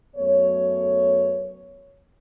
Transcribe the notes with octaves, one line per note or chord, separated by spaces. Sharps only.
F#2 A3 B3 C#5